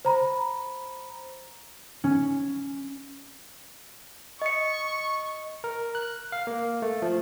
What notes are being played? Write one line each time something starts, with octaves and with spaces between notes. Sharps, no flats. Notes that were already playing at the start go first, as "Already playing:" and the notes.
C5 A#5 B5
C#4
D#5 C#6 C#7
A#4
F#6
F5
A#3
A3
F3